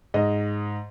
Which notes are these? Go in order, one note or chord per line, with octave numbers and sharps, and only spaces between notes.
G#2 D#5